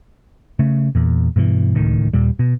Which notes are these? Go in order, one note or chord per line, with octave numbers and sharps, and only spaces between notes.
C#3 A3
E2 A#2
G2 B2 D#3 E3
D1 C#2 A2 D#3
D#2 A#2 G3
B2